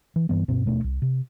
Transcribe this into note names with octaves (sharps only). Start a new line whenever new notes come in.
E3
G2 E3 B3
D1 G2 B2 C4
D#1 B2 A3 D4
C2
C3